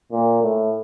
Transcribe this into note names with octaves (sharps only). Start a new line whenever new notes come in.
A#2
A2